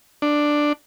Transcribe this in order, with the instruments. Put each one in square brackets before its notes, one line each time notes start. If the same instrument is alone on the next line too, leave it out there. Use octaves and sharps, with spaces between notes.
[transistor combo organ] D4